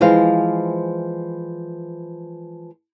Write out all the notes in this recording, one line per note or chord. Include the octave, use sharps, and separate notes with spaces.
E3 F3 G#3 C5 F5